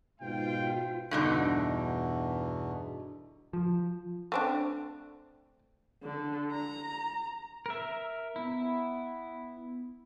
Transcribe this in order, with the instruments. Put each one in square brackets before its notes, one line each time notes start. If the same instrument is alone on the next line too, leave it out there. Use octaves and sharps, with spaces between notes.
[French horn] G#2 [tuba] B2 [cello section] F4 [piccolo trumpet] G5
[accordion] E2 B2 [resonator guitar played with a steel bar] G2 D3 D#4
[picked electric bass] F3
[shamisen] A3 C4 D4
[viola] D3
A#5
[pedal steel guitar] A#4 E5
[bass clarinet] B3 [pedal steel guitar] E4